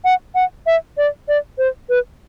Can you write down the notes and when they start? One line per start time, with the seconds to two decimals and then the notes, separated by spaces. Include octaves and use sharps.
0.04 F#5
0.35 F#5
0.66 E5
0.97 D5
1.28 D5
1.58 C5
1.89 B4